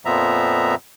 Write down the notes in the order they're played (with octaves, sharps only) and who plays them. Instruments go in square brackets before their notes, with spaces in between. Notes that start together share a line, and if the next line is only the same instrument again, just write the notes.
[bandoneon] F2 A#2 F3 B3 E5 A#5